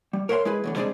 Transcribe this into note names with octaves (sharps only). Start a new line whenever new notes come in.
G3
A#4 C#5 E5 F#5 C6
G#3 E4 G#4 B4
E2 A2 D3
G3 G#3 C4 D4 F#4 G#4